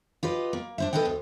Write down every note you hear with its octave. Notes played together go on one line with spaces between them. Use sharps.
F4 G4 B4 D#5
A#3
D4 C5 E5
B3 A4 B4 D#5 F#5 G5
D2